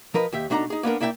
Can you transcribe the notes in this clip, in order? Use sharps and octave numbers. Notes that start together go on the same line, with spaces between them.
F3 A#4 B4 D#5
D#2 G4 E5
B2 A3 D4 D#4 D#5 A#5
D#4 G#4
A#3 B3 D4 A#4
A#3 E4 D5 E5 F#5 G5